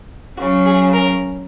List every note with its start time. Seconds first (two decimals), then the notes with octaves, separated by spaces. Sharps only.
0.37 C#3 F#3 C#4 F#4
0.66 G#4
0.93 A#4